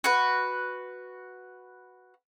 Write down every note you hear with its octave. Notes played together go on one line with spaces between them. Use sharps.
F#4 B4